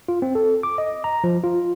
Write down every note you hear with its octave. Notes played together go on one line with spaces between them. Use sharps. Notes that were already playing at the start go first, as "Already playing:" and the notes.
F4
C4
A4
D6
D#5
A#5
F3
F4